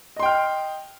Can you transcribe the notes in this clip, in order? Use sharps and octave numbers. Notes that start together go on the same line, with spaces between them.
D#5 G5 C6 F6